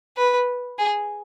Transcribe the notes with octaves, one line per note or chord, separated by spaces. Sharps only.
B4
G#4